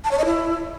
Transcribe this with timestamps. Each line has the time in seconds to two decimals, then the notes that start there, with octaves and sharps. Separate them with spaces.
0.04 A5
0.11 C#5
0.18 D#5
0.25 E4